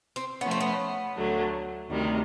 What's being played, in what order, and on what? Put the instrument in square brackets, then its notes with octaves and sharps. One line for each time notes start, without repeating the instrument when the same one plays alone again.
[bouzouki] C4
[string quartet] F3 A3 C#4 [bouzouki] B3
[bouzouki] C4
B3
[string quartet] D2 D3 F#3 A3
D2 C3 D#3 G3